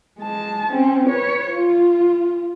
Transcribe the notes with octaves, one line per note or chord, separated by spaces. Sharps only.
G#3 A5
C4 C#4
B4 C#5
F4